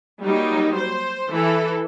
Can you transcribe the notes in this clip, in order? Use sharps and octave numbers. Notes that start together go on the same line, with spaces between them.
F#3 G3 A#3 D#4
C5
E3 A4